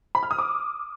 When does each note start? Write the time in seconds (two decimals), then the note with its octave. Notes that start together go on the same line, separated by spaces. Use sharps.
0.15 B5
0.23 F6
0.31 D#6
0.39 D6